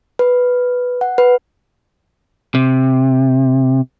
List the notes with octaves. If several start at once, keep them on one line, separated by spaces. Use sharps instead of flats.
B4
F#5
B4
C3